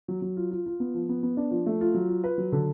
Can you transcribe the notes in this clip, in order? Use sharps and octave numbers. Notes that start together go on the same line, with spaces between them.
F#3
F#3
F4
F4
F4
B3
F3
B3
B3
D4
F3
A3
F4
F#3
F4
B4
F#3
D3